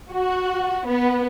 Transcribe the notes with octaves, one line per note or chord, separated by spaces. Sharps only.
F#4
B3